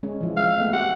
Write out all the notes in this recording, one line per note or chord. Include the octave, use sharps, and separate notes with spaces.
G#3 C#4
E3 F3
G#3 F5
A3 B3
G4 F#5